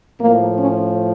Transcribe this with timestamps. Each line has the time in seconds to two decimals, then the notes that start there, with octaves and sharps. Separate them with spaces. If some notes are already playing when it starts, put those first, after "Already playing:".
0.20 A2 F3 A#3
0.57 C#4